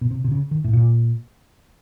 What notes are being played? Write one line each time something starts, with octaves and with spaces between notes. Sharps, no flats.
B2
C3
C3
C#3
D#3
A2
A#2